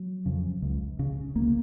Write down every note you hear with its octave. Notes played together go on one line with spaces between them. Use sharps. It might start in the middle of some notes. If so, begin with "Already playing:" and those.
Already playing: F#3
F2 C#3
C#2
C#3
C#2 A#3